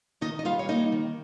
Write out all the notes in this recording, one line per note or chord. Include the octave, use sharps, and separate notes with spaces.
D#3 D#4 D#5
D#5
G3 F4 F5
C#5
A#3 D#4 D#5
D#3